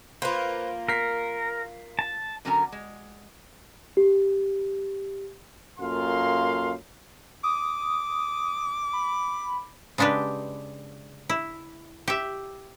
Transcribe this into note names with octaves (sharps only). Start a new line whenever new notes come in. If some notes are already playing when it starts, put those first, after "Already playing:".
A#3 F4 B4 C5
A#4 B6 C7
A5
D3 F#3 C#4 A#4 G#5 A#5
G#3
G4
F#2 A#3 F4 A4 F5 C6
D6 D#6
B5
C#3 G#3 D4 G4 B4
E4
G4 E5